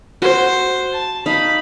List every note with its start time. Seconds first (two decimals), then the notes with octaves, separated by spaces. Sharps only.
0.22 F#4 C5
0.93 A5
1.26 D#4 F5 B5